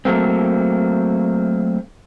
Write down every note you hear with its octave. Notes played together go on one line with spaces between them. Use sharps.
F#3 A3 A#3 C4